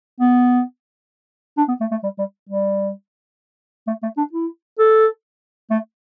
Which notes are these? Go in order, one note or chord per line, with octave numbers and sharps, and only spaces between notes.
B3
D4
B3
A3
A3
G3
G3
G3
A3
A3
D4
E4
A4
A3